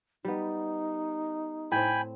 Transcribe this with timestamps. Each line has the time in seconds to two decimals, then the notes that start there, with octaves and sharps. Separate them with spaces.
0.25 G3 B3 D#4
1.72 A2 C4 G5 G#5 B5